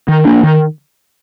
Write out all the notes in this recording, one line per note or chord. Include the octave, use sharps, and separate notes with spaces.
D#3
A#3 D4
D#3